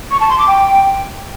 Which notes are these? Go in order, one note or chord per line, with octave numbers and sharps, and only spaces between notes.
C#6
A5
C6
D6
G5